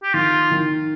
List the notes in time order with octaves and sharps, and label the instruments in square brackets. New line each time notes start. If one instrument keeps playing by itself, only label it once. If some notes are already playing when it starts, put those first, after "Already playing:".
[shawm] G4
[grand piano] D#3 [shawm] F4
[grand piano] D#3